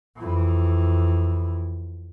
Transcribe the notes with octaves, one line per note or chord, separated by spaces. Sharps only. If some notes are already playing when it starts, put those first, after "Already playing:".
F2 E3